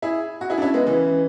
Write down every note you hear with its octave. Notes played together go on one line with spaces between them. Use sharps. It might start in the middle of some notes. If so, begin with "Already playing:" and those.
E4 G#4
F#4
E4 G#4
D4
C#4 E4
G#3 B3
C#3 E3